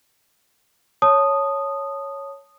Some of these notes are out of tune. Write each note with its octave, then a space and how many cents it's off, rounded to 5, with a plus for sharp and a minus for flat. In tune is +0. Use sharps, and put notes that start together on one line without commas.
C#5 +0 A5 +0 D#6 -10